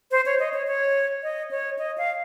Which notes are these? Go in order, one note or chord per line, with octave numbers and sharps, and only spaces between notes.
C5
C#5
D#5
C#5
C#5
D#5
C#5
D#5
F5